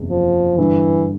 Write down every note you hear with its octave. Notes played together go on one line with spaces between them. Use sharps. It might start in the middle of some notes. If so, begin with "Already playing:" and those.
Already playing: F#1 E2 C3
F3
G2 D3 E3 G3